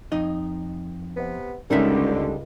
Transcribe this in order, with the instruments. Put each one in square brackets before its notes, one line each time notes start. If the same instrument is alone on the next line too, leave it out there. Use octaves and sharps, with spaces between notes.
[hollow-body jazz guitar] F2 D#4 D#5
[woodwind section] C3 B3
[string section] C#2 [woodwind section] D3 [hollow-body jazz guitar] G3 D#4 E5 [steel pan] C#4 A4 A#4